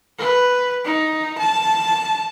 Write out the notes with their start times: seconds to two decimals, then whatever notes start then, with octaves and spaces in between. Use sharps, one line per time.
0.18 B4
0.85 D#4
1.39 A5